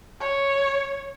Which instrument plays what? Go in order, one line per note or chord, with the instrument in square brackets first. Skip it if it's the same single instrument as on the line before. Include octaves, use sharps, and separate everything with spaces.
[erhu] C#5